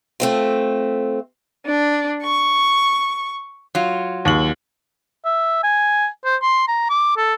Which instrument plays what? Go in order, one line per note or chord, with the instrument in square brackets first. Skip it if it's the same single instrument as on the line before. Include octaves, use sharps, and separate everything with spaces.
[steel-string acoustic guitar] A3 C4 F4
[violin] D4
C#6
[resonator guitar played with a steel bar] F#3 F4
[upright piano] D#2 F#7
[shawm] E5
G#5
C5
C6
A#5
D6
A4